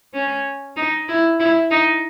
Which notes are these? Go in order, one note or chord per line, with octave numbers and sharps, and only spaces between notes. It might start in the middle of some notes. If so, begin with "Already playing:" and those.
C#4
D#4
E4
E4
D#4